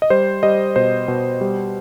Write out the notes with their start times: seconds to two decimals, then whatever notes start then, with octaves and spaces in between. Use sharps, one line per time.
0.02 D#5
0.10 G3 C5
0.43 G3 D#5
0.76 B2 C5
1.08 B2
1.41 G3